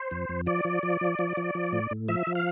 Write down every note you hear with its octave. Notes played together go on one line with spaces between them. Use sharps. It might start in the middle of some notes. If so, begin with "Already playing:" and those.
Already playing: C5
F2
F2
F3 D5
F3
F3
F3
F3
F3
F3
A2
A2
F3 E5
F3
F5